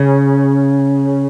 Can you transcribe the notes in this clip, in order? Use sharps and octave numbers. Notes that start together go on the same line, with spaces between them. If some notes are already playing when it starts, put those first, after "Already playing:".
Already playing: C#3